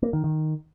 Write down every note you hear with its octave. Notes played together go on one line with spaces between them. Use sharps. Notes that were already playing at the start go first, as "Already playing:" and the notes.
A#3
D#3
D#3